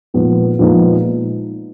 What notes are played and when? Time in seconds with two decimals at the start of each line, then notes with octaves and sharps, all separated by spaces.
0.14 A#2 F3 G#3 B3 D#4
0.59 A#2 F3 G#3 B3 D#4